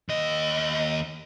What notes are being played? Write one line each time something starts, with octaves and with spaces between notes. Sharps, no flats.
D#2 D#5